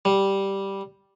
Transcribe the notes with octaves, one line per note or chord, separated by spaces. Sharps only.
G3